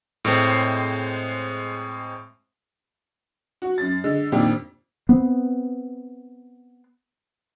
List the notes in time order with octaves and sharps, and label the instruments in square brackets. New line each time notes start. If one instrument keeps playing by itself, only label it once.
[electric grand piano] A2 G#3 C4 C5
[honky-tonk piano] F#4
F#2 A6
D3 G#3
F2 A#2 D#3 D4 G4
[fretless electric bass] B3 C4